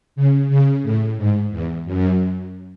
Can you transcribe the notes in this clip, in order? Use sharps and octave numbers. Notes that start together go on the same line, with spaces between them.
C#3
C#3
A2
G#2
E2
F#2